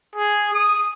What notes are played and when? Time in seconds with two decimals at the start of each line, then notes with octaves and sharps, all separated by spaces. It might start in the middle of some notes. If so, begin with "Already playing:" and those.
0.15 G#4
0.53 D#6